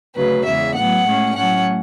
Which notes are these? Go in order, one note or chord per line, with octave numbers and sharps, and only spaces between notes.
D2 C#3 F#3 B4
E2 C#3 G#3 E5
A2 F#3 B3 F#5
A2 G#3 C#4
A2 F#3 A3 C#4 F#5